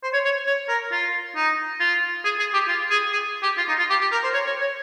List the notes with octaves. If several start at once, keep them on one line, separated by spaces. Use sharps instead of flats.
C5
C#5
C#5
C#5
A#4
F4
D#4
F4
G#4
G#4
G4
F4
G#4
G#4
G4
F4
D#4
F4
G4
G4
A#4
C5
C#5
C#5
C#5